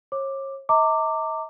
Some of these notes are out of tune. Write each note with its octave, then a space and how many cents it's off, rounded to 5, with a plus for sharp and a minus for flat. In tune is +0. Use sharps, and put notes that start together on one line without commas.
C#5 -35 D6 +5
D#5 +45 A#5 -35 D6 +0